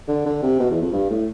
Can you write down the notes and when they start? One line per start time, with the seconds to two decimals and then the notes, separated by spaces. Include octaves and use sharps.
0.08 D3
0.26 D3
0.42 C3
0.59 B2
0.71 E2
0.81 F2
0.93 G2
1.10 A2